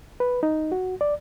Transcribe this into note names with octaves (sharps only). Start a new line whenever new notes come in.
B4
D#4
F#4
D5